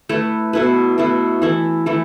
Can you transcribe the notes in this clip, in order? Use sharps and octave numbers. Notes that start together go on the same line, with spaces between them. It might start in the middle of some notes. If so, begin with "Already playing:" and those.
A3 E4 B4
B2 A3 E4 B4
B2 A3 E4 B4
E3 A3 E4
E3 A3 E4